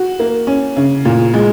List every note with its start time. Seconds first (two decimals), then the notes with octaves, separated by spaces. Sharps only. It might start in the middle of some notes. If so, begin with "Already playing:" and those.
Already playing: F#4
0.20 A#3
0.47 C#4
0.76 C#3
1.05 A#2
1.34 G#3